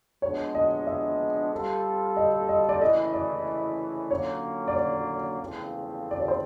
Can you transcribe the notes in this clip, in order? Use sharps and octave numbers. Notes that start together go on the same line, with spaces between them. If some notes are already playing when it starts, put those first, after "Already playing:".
F3 G#3 B3 D4 C#5
D#5
E5
G3 C4 F4 A4
D#5
D#5
D5
C#3 E3 A3 C#4 E4 D#5
D5
D3 F#3 A#3 C#4 F4 C#5
D5
C#5
E2 C#3 F3 A3 C4
D5
C#5
C5